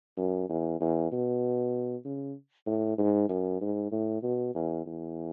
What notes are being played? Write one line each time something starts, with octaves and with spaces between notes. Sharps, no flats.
F#2
E2
E2
B2
C#3
A2
G#2
F#2
G#2
A2
B2
E2
E2